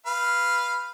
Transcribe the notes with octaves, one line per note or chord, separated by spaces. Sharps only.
B4 F5